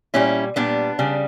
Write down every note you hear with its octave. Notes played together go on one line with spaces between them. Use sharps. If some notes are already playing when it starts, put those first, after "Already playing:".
A#2 G3 C#4 E4
A#2 G3 B3 D4
C#3 G3